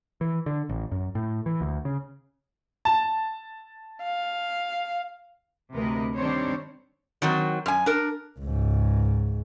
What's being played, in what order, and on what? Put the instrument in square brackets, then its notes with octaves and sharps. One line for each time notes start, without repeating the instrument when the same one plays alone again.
[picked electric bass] E3
D3
A1
F#2
A2
E3
D2
C#3
[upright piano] A5
[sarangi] F5
[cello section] D2 C3 A#4 B4 D#5
D#3 G3 C4 D4 C5 C#5
[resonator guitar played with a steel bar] D#3 F#3 C4
F#2 G#5
D4 A#4
[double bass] C#2 G#2